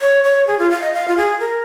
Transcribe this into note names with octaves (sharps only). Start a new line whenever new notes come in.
C#5
C#5
G#4
F4
F5
D#5
F5
F4
G#4
A#4